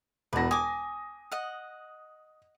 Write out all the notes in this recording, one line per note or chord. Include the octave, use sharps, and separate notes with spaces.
E1 E2 B4 A5 A#6
G#5 D6 D#6
D#5 F#5